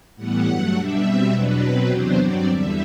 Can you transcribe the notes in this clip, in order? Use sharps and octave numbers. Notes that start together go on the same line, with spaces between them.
A2 E3 G3 B3 F#5
G2 F#3 A3
B2 G3 D4 E5
B2 G3 C4
E2 B2 F#3 B3 D4 B4
B2 F#3 C4
E2 C3 F#3 B3 D4 C5
G2 F#3 C4 D5
E2 D3 G3 E5